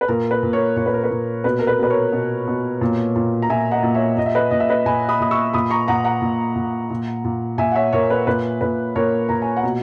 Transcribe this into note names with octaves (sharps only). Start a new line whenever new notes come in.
B4
A#2 A#4
B4
A#2
A#4 C#5
A#2 C#5
B4
A#4
B4
A#2
B2 B4
A#4
B4
B2 B4
A#4 C#5
B2
B2
A#2
A#2
A#5
A#2 E5 G#5
D#5 F#5
A#2
C#5 E5
A#2 D#5
E5
B4 D#5
A#2 D#5
E5
B4 D#5
A#2 G#5 B5
B5 D#6
A#2 D#6
C#6 E6
A#2 B5 D#6
A#5 C#6
A#2 F#5 A#5
F#5 A#5
A#2
A#2
A#2
A#2
A#2 E5 G#5
F#5
C#5 E5
A#2 A#4 C#5
B4
A#2 B4
A#2 B4
A#2 A#4 C#5
A#2 A#5
G#5
F#5
B2